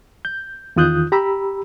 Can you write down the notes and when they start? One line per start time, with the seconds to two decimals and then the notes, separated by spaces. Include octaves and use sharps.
0.25 G6
0.76 E2 D#3 F4 D#6 F#6 G6
1.12 G4 A#5 B5 E6